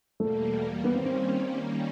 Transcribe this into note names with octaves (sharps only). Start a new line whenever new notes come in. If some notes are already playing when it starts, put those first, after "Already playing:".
E2 B2 G3 A3 A#3
D#3 G3 A#3 B3 C#4
C4
C4